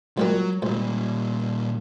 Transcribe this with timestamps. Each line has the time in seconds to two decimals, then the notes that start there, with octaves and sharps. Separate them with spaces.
0.18 C#2 A#2 F#3 G3
0.62 C#2 A#2 G3